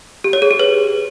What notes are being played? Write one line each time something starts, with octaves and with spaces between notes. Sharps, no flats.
G4
C#5
G#4
G4
B4